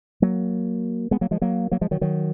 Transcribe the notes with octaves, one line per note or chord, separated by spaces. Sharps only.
F#3 A#3
G#3 B3
F#3 A#3
F3 G#3
F#3 A#3
F#3 A#3
F3 G#3
D#3 F#3
D#3 F#3